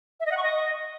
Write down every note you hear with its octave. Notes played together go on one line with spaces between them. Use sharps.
E5
D#5
F#5
C#6
D#5